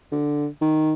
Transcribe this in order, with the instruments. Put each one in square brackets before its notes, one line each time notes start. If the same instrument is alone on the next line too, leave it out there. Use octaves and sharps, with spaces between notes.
[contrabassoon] D3
D#3